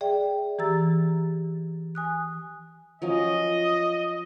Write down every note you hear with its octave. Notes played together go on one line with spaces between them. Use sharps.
G#4 D5 E5 G5
E3 G4 A#5 E6 A6
G#5 D#6 F#6
F3 F#3 C#4 D#5